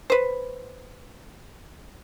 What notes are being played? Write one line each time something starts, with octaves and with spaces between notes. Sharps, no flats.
B4 C5